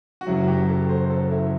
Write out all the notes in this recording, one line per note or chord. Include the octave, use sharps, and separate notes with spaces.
F#4
F#1 F#2 F#3 E4
F#4
G4
A4
C5
A4
E4